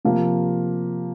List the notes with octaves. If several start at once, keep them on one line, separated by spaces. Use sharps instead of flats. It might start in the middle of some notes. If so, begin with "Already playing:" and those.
C3 F3 A#3